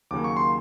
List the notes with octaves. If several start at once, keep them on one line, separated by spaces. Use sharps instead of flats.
D#2 C#3 F#3 A#3 D6
C#6
C6